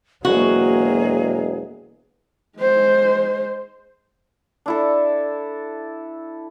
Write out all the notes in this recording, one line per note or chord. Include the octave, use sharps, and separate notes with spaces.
E1 F#3 A#3 F#4 G#4
G#3 C5
D4 E4 A4